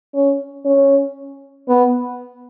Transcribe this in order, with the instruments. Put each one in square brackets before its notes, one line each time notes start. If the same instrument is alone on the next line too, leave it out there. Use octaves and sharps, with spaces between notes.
[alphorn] C#4
C#4
B3